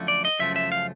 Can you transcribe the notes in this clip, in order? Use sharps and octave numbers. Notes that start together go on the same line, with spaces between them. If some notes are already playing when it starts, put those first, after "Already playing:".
Already playing: F#2 D3 F3 A3
D5
D#5
F#2 C#3 F3 A3 E5
E5
F5